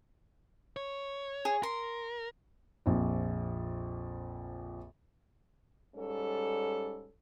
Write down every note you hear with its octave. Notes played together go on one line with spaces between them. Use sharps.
C#5
G#4
A#4 C6
A#1 F2
G#2 G3 C#4 A4